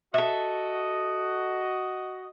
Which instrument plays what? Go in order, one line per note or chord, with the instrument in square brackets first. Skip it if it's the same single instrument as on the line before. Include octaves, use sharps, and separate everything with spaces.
[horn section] F#4 D#5 [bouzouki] A4 E5